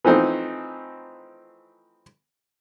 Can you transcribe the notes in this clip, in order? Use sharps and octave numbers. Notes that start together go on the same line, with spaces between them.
E3 F3 A3 C4 D#4